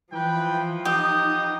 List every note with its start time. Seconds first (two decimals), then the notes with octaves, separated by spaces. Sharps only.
0.12 E3 F3 B4 G5
0.85 B3 D#4 G4 D#6